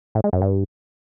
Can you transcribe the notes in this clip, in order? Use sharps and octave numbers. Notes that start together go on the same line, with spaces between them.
A2
G#3
F#2
G2